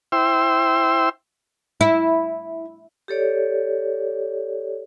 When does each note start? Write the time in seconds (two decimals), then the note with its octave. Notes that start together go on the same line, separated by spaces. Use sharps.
0.12 E4 C5 G5 C6 E6
1.81 E4
3.08 G4 A4 C#5 D5